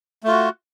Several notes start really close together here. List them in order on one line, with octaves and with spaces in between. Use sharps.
A3 F4 F#4